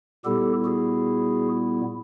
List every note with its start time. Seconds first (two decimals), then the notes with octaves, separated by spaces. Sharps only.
0.25 A#2 G3 B3 E4 G4 A4
0.65 F#4 G#4